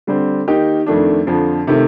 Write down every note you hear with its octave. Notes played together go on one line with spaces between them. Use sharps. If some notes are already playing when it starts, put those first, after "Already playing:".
D3 G3 C4
D#3 A#3 D#4 G4
F2 D#3 A3 D4
F2 D3 F3
C3 D#3 A3